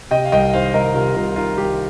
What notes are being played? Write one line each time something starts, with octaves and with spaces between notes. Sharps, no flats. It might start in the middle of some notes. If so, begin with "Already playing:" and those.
C3 D#5 G5
F5
C2 D#5 G5
D#3 C5 F5
C2 A#4 D#5
C3 F4 A#4
C2 F4 A#4
D#3 F4 A#4
C2 G4